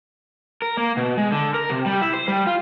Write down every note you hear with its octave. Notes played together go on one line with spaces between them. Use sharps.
A#4
A#3
B2
G#3
D3
A#4
C3
G3
E4
C5
G3
F4